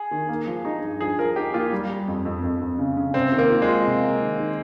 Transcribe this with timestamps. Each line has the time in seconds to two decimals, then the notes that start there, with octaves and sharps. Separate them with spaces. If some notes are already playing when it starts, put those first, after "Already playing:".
Already playing: G#4
0.11 D#3
0.29 A#3
0.47 F3
0.65 D#4
0.83 G2
1.01 F3 G#4
1.18 F3 A#4
1.36 D#4 G4
1.54 A#3 F4
1.72 G3
1.90 G3
2.08 F2
2.25 F2
2.43 F2
2.61 F2
2.79 C#3
2.97 C#3
3.14 C3 C4
3.32 D#3
3.38 A#3
3.50 F4
3.62 G#3
3.68 F4
3.86 C3
4.03 A#3
4.21 D#3
4.40 D#3